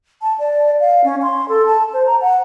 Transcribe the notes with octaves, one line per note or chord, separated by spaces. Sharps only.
A5
D5
F5
C#4
C6
A4
A5
C5
A#5
F#5